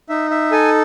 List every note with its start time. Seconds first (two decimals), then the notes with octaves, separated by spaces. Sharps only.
0.09 D#4 E5
0.31 E5
0.52 A4 G#5